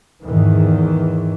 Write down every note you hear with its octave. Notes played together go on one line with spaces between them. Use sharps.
E2 G#2 D#3 E3